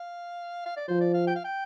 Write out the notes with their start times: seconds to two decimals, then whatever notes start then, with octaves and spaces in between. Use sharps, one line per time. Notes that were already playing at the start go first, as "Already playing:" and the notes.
Already playing: F5
0.66 F5
0.77 D5
0.88 F3 C5
1.01 D5
1.14 F5
1.27 G5
1.36 F5
1.44 G5